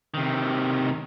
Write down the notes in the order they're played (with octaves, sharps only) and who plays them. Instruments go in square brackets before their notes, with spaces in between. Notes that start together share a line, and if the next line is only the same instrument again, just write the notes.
[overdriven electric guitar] C3 D#3